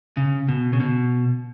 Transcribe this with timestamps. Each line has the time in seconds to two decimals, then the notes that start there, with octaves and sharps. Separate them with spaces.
0.17 C#3
0.49 B2
0.73 C#3
0.80 B2